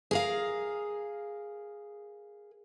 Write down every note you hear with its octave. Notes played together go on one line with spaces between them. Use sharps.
G#4 A#4 F5